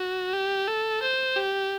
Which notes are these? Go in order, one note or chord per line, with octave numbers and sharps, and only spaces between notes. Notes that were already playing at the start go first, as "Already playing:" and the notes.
Already playing: F#4
G4
A4
C5
G4